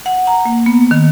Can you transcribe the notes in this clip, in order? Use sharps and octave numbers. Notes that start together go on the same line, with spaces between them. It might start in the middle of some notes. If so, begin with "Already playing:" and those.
F#5
A#5
A#3
B3
D#3